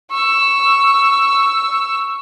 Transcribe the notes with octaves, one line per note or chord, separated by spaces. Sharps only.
C#6 E6